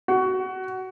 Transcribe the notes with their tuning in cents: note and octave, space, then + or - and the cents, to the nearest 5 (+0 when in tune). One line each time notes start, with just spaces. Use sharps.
F#4 +20